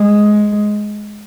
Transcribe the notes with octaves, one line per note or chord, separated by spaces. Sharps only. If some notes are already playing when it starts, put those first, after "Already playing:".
Already playing: G#3